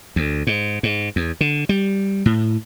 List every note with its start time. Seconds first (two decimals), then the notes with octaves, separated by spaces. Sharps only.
0.16 D2
0.47 G#2
0.83 G#2
1.16 E2
1.41 D3
1.69 G3
2.26 A2